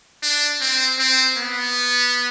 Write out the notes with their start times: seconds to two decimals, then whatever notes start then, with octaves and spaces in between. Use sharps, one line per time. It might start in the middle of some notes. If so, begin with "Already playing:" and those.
0.23 D4
0.61 C4
0.99 C4
1.37 B3